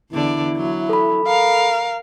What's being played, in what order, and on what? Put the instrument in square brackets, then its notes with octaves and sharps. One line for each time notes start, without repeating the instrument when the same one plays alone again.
[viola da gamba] E2 D3 D5 [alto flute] E4
[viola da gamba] F#3
[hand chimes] A4 B5
[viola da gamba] A#4 [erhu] F5 [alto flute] A#5